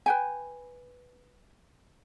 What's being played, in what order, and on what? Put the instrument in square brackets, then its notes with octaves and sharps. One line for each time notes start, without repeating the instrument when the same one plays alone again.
[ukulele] B4 G5 G#5